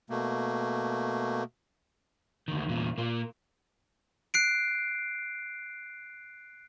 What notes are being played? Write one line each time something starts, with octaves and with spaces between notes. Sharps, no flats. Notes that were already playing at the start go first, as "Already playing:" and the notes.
B2 A3 A#3
D2 D#3
E2 A#2
A#2 A#3
F#6 C7 D7